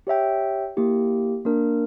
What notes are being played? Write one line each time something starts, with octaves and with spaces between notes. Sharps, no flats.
G4 C#5 E5 G5
A#3 E4 G4
A#3 D4 A#4